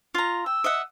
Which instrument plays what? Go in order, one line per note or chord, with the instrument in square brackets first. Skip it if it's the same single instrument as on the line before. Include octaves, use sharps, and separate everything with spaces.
[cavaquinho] F4 A#5
[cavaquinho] G5 [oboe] E6
[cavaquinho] D#5 E5 F#5